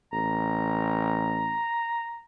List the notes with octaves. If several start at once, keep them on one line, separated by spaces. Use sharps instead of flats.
A1 A#5